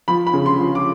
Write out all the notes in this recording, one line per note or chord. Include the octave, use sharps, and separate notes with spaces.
F3 B5
B5
C#3
C6
F3
D6